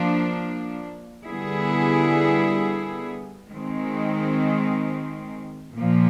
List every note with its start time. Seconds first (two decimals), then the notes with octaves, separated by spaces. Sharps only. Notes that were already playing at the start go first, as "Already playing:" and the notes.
Already playing: F3 A#3 D4
1.25 D3 G3 B3 E4 G#4
3.50 D#3 G#3 C4
5.76 A#2 F3 A#3